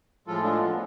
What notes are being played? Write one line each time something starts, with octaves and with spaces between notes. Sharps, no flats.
A2 F3 G#3 F4 A4
D4 F4
B3